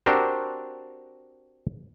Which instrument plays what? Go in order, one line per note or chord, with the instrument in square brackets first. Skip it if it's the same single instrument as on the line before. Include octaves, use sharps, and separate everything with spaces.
[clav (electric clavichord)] C4 D4 F#4 G4 A#4 C5